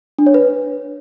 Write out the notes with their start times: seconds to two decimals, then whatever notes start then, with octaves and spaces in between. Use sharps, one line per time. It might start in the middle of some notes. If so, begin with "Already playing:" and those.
0.18 D4
0.26 C#5
0.34 B4